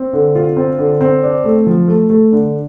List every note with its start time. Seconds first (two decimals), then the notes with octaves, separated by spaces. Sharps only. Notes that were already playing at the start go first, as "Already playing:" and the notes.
Already playing: C4
0.13 D3
0.35 F4
0.57 C4
0.79 D3
1.01 C4
1.23 D4
1.44 A3
1.67 F3
1.88 A3
2.10 A3
2.32 D3